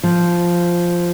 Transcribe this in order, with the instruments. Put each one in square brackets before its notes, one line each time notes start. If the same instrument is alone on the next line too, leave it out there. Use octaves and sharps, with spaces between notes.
[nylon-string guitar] F3